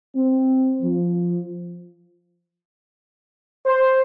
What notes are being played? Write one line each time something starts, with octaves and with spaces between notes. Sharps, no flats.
C4
F3
C5